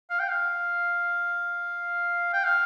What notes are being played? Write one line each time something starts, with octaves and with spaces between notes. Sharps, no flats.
F5
G5
F5
G5
F5